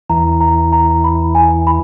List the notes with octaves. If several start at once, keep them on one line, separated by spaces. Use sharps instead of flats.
E2 E3 A#5
A#5
A#5
B5
G#5
B5